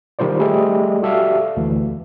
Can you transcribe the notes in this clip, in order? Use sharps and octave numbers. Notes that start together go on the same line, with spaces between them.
D#3 G3 F4 C5 D5
G3 A3 G#4 A4 D#5 G5
F#4 G4 A4 D5 E5 F5
D2 E3